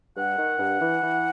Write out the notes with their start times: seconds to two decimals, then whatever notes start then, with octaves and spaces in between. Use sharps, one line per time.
0.17 G2 F#5
0.38 D#3
0.59 G2
0.81 E3
1.02 E3